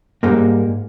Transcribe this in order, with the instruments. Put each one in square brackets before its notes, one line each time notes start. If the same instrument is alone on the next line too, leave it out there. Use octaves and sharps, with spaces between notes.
[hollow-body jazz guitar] G#2 G3 G#3 A#3